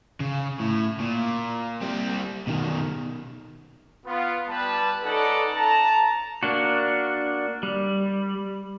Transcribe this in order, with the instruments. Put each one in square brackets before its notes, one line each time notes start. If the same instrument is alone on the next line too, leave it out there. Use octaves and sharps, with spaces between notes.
[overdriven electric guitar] C#3
A2
A#2
G3 C4
B2 D#3
[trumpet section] B3 F4
G3 B4 A5
C#4 D#4 A4 B4 D5 F#5
A5 A#5
[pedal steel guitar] A#3 D4 F#4
G3